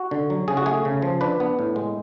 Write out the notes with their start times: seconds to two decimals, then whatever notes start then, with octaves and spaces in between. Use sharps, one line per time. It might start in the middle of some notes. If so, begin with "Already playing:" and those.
Already playing: F#4
0.11 D3
0.30 F#3
0.48 C#3 G#4
0.57 F#4
0.66 A3 G#4
0.85 C#3
1.02 F3
1.21 D4 B4
1.40 B3
1.59 A2
1.76 G#3